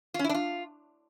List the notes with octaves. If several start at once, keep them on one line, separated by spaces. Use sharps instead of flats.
F4
C#4
E4
D4
F4